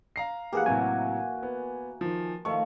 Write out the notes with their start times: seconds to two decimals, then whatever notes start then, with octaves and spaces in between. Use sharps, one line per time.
0.16 F5 A#5 C7
0.53 E3 A#3 G4 G#4 F#5
0.66 A2 C3 F#3 F#4 G#5
1.43 B3
2.01 D#3 F3
2.45 D#3 F3 A3 C#6